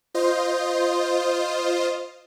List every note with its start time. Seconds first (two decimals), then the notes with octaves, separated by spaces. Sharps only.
0.15 F4 C5 D#5